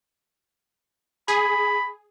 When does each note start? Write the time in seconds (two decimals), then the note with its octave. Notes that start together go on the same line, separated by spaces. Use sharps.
1.28 G#4 B5